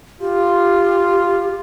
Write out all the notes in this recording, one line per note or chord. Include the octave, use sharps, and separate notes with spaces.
F4 G4